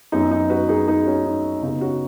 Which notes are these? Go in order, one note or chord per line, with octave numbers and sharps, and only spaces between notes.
F#2 F#3 B3 D#4
D#4
F#4 B4
D#4 G#4
D#4 G#4
C#4 F#4
D#4
C#3 F#3 B3 D#4
C#4 F#4